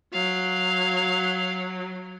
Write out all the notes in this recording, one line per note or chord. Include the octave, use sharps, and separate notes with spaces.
F#3 F5